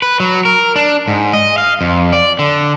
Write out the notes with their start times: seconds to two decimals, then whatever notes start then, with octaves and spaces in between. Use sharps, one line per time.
0.02 B4
0.20 F#3
0.45 A#4
0.76 D4
1.08 G#2
1.34 D#5
1.58 F5
1.81 F2
2.13 D5
2.39 D3